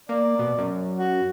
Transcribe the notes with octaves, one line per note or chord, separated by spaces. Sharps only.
A#3 D5
B2
F#2
F#4